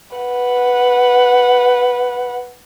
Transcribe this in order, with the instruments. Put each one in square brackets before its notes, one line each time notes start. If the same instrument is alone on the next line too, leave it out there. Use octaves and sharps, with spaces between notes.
[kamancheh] B4 F#5